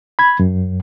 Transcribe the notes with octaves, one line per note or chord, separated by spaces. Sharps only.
B5 G#6
F#2